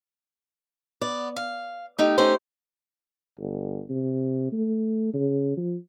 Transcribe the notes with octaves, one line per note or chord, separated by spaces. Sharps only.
B3 D5
F5
A3 D#4 G4
A3 C#4 D#4 G4 C5
G1
C3
A3
C#3
F3